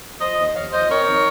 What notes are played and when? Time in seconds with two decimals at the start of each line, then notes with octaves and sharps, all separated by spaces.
0.21 F3 C5 D#5
0.38 D#2
0.55 D#2 C#5 F5
0.72 F3 C5 D#5
0.89 C4 A#4 C#5
1.07 D#3